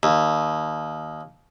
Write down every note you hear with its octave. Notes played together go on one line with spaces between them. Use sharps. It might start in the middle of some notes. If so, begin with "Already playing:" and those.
D#2